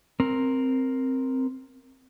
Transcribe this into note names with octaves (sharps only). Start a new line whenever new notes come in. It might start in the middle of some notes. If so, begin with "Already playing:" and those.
C4 A#4